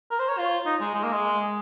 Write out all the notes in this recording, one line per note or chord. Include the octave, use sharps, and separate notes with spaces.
A#4
C5
C#5
F4
D#4
G#3
G#3
A#3
G#3